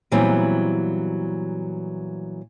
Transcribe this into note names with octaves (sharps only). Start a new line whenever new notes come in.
A#2 E3 F#3 G3 B3 C4